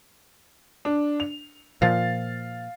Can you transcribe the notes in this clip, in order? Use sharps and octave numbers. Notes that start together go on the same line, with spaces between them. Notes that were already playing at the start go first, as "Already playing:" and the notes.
D4
F7
A#2 F3 F5 A6